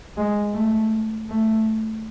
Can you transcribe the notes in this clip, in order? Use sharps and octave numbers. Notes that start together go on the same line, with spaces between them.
G#3
A3
A3